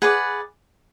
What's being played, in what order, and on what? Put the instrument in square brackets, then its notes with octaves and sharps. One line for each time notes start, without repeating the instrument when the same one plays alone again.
[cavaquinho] G#4 B4 D5 F#5